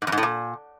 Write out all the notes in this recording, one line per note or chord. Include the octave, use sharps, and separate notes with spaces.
G#2
F2
G#2
A2
A#2